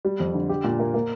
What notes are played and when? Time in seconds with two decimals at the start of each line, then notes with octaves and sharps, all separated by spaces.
0.05 G3
0.20 F2
0.34 D3
0.49 G4
0.64 A#2
0.79 A#3
0.94 A#3